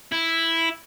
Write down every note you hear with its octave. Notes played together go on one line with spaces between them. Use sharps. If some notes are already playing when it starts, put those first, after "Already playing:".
E4